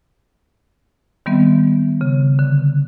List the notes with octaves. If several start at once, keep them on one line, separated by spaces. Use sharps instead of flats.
D#3 G3 B3 C4 E5
C#3
D3